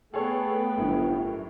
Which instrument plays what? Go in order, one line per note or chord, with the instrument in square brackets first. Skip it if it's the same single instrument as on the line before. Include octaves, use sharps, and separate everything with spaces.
[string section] A3 B3 [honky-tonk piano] G#4 A4 C#5 [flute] G5
[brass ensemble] G1 [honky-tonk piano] F#2 A2